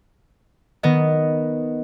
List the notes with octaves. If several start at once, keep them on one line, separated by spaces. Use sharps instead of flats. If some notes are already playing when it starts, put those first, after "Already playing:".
D#3 B3 D#5